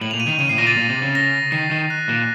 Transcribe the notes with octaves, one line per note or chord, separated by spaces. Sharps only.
A2 F#7
F7
A#2
D#7
D#3 F7
C#3 D#7
A2 C7
A#2 A#6
A6
A#2
C3
C#3
A#6
D#3 C7
D#3
F#6
A#2